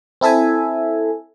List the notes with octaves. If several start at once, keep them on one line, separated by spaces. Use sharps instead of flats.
C4 E4 A4 E5 G#5